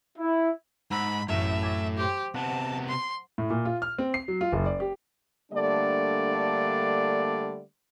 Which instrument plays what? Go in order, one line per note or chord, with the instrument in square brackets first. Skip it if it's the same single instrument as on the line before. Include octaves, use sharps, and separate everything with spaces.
[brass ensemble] E4
[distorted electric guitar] G#2 [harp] F#5 A#5 E6 [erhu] B5
[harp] A1 F#2 [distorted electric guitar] A2 [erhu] E5
[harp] G#5 D6 A6
[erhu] G4 [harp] C5 G5
[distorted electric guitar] C3 B3 [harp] F#5 [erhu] A5
[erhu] C6
[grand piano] A2
A#2
F4
F6
C4
C7
F#3
F4
F#1
D5
G4
[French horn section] D3 G3 A3 A#3 D4 D5